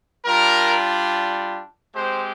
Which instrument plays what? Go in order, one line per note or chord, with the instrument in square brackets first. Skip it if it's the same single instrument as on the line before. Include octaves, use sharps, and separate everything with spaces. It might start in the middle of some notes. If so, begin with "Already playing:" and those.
[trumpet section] G3 D4 F4 A#4
G#3 C4 G4 C5